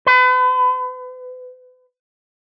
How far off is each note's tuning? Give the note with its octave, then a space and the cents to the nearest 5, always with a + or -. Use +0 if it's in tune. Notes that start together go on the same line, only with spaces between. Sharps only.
B4 +40